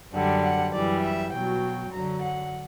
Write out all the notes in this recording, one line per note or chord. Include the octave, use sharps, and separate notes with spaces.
F#2 D3 G3 F#5
F#5
F#2 E3 G3 D5
E5
B2 F#3 G5
F#2 D3 F#3 A#5
F#5